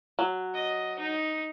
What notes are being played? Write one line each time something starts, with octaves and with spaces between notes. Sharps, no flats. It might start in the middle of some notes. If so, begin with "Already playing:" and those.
F#3
D#5
D#4